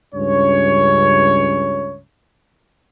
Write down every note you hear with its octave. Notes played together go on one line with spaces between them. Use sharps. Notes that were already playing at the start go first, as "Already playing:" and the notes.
C#2 G2 C#4 C#5